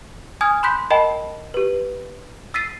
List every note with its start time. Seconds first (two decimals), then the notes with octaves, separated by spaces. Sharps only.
0.41 G#5 D#6 F6 G#6
0.63 B5 C6 F#6 G6 B6
0.90 A#4 D#5 G5 A5 B5
1.54 G4 B4
2.54 E6 A6 B6 C7 D#7